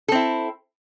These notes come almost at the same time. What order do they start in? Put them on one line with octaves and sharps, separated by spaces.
A4 C4 E4